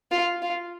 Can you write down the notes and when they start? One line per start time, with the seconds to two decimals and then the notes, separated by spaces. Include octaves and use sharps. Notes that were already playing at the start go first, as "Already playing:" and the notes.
0.11 F4
0.42 F4